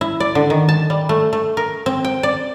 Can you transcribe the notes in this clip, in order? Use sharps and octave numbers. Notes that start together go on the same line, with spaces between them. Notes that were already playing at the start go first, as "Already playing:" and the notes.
E4
D5
D3
D#3
A5
G3
A3
A3
A#4
C4
G5
D5